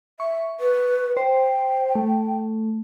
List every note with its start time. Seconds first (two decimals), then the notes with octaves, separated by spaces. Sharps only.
0.20 E5 C#6
0.60 B4
1.17 C5 G5
1.95 A3